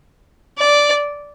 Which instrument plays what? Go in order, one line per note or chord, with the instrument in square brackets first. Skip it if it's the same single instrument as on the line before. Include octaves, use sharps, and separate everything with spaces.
[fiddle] D5